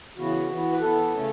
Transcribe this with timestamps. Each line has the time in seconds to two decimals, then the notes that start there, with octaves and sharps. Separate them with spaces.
0.17 C#3 E3 B3 F#4
0.49 E3 B3
0.72 B4
0.81 E3 B3 A4
1.13 C#3 A3 C#4